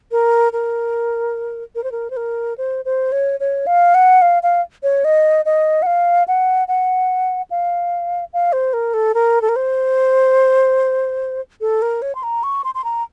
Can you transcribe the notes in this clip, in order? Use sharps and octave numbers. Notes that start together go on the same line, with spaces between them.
A#4
A#4
A#4
C5
A#4
C5
A#4
C5
C5
C#5
C#5
F5
F#5
F5
F5
C#5
D#5
D#5
F#5
F5
F#5
F#5
F5
F5
C5
A#4
A4
A#4
A4
A#4
C5
A4
A#4
C#5
C6
A#5
C#6
C6
C6
A#5